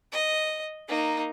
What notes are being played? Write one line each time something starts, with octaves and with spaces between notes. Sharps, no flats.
D#5
A#3 D#4